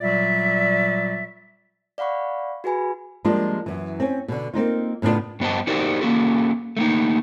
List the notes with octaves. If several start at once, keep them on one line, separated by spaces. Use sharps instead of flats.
A#2 F#3 G3 D5 E5
D5 F5 F#5 B5 C#6
F#4 G#4 B4 G#5 B5
F3 G3 G#3 A#3 D4 F4
F#2 E3
C4 C#4
B2 D3
A#3 C4 D#4 F4
A2 C#3 B3 D4 F4
G2 B3 C5 D#5 A5
D#4 F#4 G4 A#4 C5 D5
A#3 C#4 F#4 A4
A3 A#3 D#4